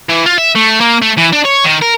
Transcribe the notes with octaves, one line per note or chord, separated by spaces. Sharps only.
E3
F4
E5
A3
A#3
A3
E3
D4
C#5
D#3
A#4